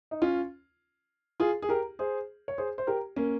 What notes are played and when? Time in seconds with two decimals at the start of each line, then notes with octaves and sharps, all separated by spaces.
0.11 D#4
0.22 C#4 F4
1.40 F4 G#4
1.62 G#4
1.69 G4 A#4
1.99 G#4 C5
2.48 C#5
2.58 G#4 C5
2.78 C5
2.87 G4 A#4
3.16 A#3 C#4